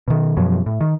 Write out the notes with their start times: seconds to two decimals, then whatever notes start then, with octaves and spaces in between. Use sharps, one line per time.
0.08 B2 D#3
0.37 F#2 B2 F3 F#3
0.66 A2
0.81 D#3